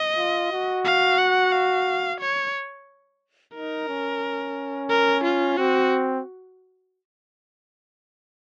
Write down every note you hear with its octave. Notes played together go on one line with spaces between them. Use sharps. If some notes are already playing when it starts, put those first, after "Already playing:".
Already playing: D#5
F4
F#4
F5
F#5
F5
C#5
D#4 A#4
C#4
A#4
F4
C4 F#4